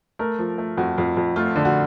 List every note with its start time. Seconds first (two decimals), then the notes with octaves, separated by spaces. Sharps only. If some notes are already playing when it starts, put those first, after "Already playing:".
0.19 A3 A#4
0.39 F3
0.58 A3
0.78 F2 F#4
0.98 F2
1.17 F2
1.36 A3 F4
1.56 D3
1.65 F#4